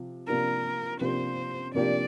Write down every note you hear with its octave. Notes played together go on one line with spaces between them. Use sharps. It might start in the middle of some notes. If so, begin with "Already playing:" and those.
Already playing: C3 F3
C3 F3 A#3 D4 G4 A#4
C3 F3 A#3 D4 G4 C5
C3 F3 A#3 D4 G4 D5